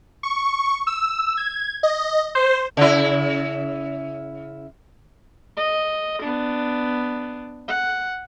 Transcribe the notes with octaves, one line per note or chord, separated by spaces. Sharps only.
C#6
E6
G#6
D#5
C5
C#3 E4
D#5
B3 D4
F#5